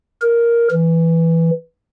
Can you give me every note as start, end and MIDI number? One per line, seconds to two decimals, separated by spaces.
0.22 0.68 70
0.71 1.50 52